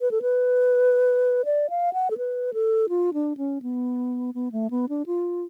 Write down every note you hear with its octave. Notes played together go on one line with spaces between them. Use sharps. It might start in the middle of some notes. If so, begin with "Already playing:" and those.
B4
A4
B4
D5
F5
F#5
A4
B4
A4
F4
D4
C#4
B3
B3
A3
B3
D4
F4